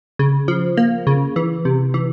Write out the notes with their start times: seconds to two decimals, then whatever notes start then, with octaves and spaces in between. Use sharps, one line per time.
0.19 C#3
0.48 F3
0.77 A#3
1.07 C#3
1.36 E3
1.65 C3
1.94 E3